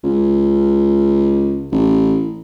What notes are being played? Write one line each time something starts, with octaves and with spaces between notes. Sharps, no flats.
C#2
A1